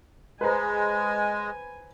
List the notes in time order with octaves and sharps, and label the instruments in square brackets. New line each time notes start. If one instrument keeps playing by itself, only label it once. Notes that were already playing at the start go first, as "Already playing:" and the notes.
[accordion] G#3 [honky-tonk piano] B4 C5 A#5 [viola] G#5